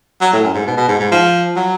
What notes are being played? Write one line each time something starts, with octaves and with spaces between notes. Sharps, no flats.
F#3
A2
F#2
G#2
B2
B2
G#2
G#2
F3
F#3